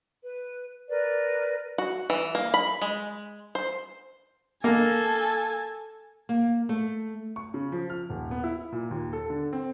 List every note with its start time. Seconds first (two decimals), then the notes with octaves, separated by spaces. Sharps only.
0.22 B4
0.88 A#4 B4 D5
1.78 F#4
2.10 E3
2.35 A#3
2.54 B5
2.81 G#3
3.55 C5
4.64 A#3 A4 G#5
6.29 A#3
6.69 A3
7.36 C#6
7.54 C#3
7.72 F3
7.90 F6
8.09 D#1
8.31 B3
8.44 E4
8.72 A#2
8.91 D#2
9.13 A4
9.30 D3
9.53 C4